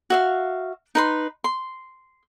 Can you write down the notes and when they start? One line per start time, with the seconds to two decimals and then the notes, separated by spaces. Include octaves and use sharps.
0.10 F#4 E5 F5
0.95 D#4 B4 C6
1.44 C6